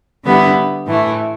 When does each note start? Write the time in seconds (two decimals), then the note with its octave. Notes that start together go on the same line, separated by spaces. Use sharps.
0.24 D3 G3 B3 E4
0.87 A2 E3 A3